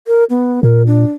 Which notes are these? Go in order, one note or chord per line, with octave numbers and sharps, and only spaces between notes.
A#4
B3
A#2 A#4
D4